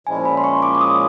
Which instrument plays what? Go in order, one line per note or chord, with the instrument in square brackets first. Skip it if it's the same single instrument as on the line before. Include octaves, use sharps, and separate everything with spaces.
[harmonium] A#2 F3 G#3 C#4 E4 [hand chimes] G#5
[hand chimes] B5
C6
C#6
D6
D6
D#6